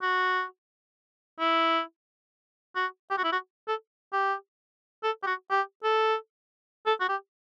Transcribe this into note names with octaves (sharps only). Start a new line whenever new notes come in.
F#4
E4
F#4
G4
F#4
E4
F#4
A4
G4
A4
G4
F#4
G4
A4
A4
F#4
G4